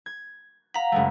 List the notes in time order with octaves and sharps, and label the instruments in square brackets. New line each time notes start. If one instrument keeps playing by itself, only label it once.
[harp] G#6
[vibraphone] F5 F#5 [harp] A#5 B6
[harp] F#1 G#3 A3